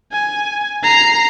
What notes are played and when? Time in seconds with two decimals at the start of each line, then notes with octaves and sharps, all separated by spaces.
0.12 G#5
0.84 A#5 C7